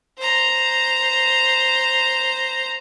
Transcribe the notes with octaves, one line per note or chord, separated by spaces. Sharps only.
C5 A#5